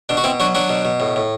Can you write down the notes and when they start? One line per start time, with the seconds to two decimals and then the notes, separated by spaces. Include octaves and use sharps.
0.09 B2 D4
0.17 F#4
0.24 B2 C4 E4
0.40 F#3 D4 F#4
0.55 F#3 D4 F#4
0.69 B2
0.85 B2
1.00 A2
1.16 A2